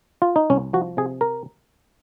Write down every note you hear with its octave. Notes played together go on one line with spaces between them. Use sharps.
F4
D#4
C2 C#4
F3 F#4
C3 G#4
A#4